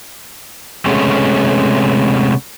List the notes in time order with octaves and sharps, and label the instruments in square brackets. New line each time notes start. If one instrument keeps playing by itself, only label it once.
[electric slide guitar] C3 G#3 A3 B3 C#4